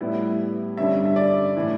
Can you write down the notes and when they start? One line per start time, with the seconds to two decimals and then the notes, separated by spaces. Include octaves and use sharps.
0.01 A2 G3 B3 E4
0.77 G2 D3 G3 C#4 E5
1.05 E5
1.16 D5
1.55 A2 E3 G3 D4